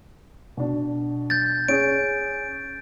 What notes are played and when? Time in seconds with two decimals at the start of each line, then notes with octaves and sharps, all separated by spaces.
0.57 B2 D4
1.30 G6 A6
1.68 C#4 G#4 D7